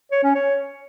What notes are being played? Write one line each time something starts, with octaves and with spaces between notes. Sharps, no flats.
C#5
C#4
C#5